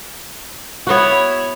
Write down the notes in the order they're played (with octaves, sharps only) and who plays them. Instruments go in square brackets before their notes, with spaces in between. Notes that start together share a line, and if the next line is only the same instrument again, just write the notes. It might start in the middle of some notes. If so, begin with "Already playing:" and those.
[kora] B3 F#4 [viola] E4 C#5